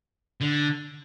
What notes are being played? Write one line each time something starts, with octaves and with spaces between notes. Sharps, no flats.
D3